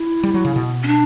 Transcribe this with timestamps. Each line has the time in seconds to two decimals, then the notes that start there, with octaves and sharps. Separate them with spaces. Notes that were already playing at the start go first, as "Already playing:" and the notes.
Already playing: E4
0.23 G3
0.34 F#3
0.45 C#3
0.56 B2
0.83 C#4
0.87 D4